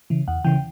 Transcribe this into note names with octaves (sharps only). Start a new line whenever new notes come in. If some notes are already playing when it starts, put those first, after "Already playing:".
C#3 E3
E2 F#5
C#3 E3 G5